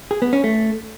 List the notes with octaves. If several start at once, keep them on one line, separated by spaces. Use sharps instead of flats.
G#4
B3
C#4
A3